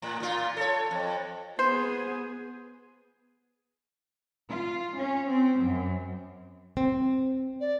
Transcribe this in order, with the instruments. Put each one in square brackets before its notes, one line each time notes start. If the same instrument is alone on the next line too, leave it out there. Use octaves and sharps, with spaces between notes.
[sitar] A2
A#2 F4
A4 C#5
F2
[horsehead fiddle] B3 G#4 [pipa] C5
[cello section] F4
C#4
C4
F#2
[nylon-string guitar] C4
[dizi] D5